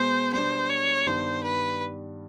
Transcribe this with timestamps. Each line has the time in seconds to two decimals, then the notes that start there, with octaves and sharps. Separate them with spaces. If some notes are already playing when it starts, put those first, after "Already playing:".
Already playing: B2 G#3 B3 C5
0.33 B2 G3 B3 D4 C5
0.69 C#5
1.07 G2 D#3 G3 B3 C5
1.43 B4